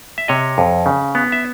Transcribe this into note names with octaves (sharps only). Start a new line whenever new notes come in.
E5
C3 C#5 D#5
F2
C#3
B3
E5